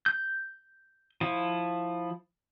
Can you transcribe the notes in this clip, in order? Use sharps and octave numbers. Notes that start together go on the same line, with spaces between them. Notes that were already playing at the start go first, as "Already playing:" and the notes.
G6
F3 E4